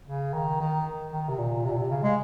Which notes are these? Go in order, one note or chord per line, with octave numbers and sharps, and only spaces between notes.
C#3
D#3
D#3
D#3
C3
A#2
C3
A#2
C3
C#3
G#3